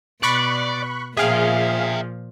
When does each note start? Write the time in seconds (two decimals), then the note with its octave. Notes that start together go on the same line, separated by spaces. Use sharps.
0.23 B2 D5 B5 C#6 F#6
1.17 A#2 F3 G#4 E5 F5 G5